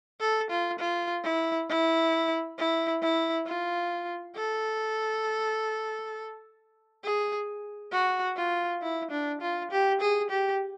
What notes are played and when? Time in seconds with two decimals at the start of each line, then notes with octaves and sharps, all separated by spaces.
0.20 A4
0.50 F4
0.79 F4
1.23 E4
1.69 E4
2.58 E4
3.02 E4
3.46 F4
4.36 A4
7.03 G#4
7.92 F#4
8.36 F4
8.82 E4
9.10 D4
9.41 F4
9.71 G4
10.01 G#4
10.30 G4